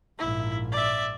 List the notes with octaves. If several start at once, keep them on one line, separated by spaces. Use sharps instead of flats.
A#1 G#2 E4
D5 E5